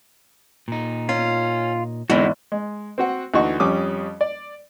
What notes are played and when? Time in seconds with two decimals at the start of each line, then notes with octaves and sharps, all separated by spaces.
0.68 A#2 D#4
1.09 C#4 F4
2.10 E2 G#2 D3 G#3 C4 E4 F#4
2.52 G#3
2.98 C4 F#4 F#5
3.34 D2 E3 D#4 F#4 C#6
3.60 F2 G3 C#4 D6 D#6
4.21 D5